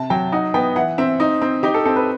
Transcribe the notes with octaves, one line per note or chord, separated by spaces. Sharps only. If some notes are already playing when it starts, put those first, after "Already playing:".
Already playing: C3 A5
F#3 G5
D#4 F#5
B3 G5
E3 F#5
C4 E5
D#4
C4
D#4 G4
A4
C4 A4
B4